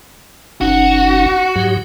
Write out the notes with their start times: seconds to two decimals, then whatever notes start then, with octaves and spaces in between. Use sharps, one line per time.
0.61 F#1 C#4 D#4 F#4
1.56 G#2 F#3 G4